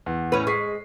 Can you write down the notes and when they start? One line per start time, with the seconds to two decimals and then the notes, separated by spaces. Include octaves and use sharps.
0.06 E2
0.32 A2 C#4 B4
0.47 G#3 C#6 B6 C7